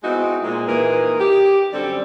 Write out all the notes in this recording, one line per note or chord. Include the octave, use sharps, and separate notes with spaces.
G#3 B3 C4 D#4 E4 F#4
A#2 G#3
A#2 D#3 E3 G#4 A#4 B4
G4
F#2 D3 G3 C4 A4 D5